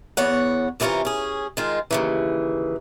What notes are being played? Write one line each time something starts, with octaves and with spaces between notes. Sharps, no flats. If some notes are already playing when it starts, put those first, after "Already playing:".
E2 B3 C#5 F#5
C3 E3 B3 C#4 F4 A#4
C#4 G#4
D#3 G#3 F4
D#2 C#3 E3